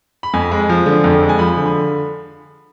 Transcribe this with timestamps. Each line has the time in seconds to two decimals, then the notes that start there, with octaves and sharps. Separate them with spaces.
0.23 B5
0.34 F2 G#5
0.51 G#3
0.69 F3
0.86 D3
1.04 F2
1.22 G#3
1.29 G#5
1.39 F3 B5
1.57 D3
1.66 B5